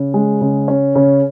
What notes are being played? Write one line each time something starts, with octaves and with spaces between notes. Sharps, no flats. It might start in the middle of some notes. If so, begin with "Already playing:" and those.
Already playing: C#3
G#3
C#3
C#4
C#3